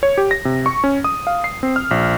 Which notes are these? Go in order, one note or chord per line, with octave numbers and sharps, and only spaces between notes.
C#5
G4
A#6
C3
C#6
C#4
D#6
F5
C7
C4
F6
A#1